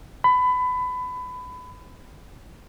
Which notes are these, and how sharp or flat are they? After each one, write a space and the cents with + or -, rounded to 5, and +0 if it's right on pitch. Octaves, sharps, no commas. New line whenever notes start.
B5 +25